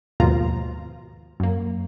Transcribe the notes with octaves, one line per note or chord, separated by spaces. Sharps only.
D#2 G#2 B2 F3 F4 A#5
F#2 A#3